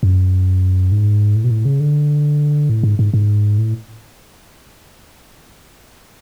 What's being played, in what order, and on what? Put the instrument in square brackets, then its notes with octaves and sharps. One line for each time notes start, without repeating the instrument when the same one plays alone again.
[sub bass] F#2
G#2
A2
B2
A2
C#3
D3
A2
G#2
G#2
G#2
A2